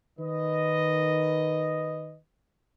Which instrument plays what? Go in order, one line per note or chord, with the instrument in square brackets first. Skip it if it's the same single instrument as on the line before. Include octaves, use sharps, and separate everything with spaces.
[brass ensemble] D#3 B4 D#5